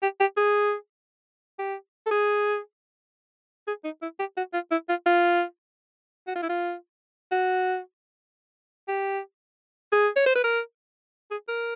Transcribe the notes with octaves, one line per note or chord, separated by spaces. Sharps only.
G4
G4
G#4
G4
A4
G#4
G#4
D#4
E4
G4
F#4
F4
E4
F4
F4
F#4
F4
E4
F4
F#4
G4
G#4
C#5
C5
B4
A#4
G#4
A#4